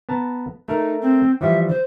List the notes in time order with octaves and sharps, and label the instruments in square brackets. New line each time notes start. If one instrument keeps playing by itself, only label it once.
[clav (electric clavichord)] B3 A5 A#5
[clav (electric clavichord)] A3 A#4 [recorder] D#4
[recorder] C4
[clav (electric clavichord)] E3 F3 G3 [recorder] E5
[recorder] C5